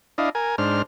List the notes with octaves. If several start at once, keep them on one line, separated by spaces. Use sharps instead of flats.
D4 E4 D#5 F5
A#4 G#5
G#2 D4 C5 F6